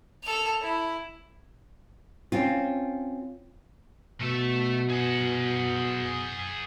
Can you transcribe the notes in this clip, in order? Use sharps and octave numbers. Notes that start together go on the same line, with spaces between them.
A4 F7
E4
C4 C#4 F4
B2 A3 E5
G#4 F#5